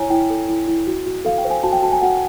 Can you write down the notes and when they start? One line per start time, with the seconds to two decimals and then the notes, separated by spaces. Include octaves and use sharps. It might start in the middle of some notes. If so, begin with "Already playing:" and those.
Already playing: E4 C#5 G#5 A#5
0.10 E4 G5
0.30 A4
0.49 E4
0.68 E4
0.87 F#4
1.06 F#4
1.25 A4 F5
1.38 G5
1.45 C5
1.50 G#5
1.63 F#4 A5
1.73 G5
1.82 F#4 A5
1.92 G#5
2.01 F#4 F#5